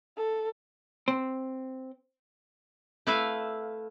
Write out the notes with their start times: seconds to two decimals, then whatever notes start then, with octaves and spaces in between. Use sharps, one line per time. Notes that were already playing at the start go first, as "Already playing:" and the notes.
0.17 A4
1.08 C4
3.07 A3 E4 B4 E5 F5